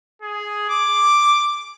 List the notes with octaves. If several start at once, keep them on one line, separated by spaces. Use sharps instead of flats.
G#4
D6